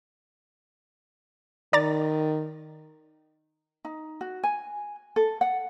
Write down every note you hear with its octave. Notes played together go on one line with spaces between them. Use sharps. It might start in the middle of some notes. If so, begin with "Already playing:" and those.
D#3 D5 A#5 A6
D#4
F#4
G#5
A4
F#5